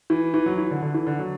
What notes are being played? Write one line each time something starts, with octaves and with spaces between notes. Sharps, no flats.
E3
E3
F#3
E3
D3
D3
E3
D3
F#3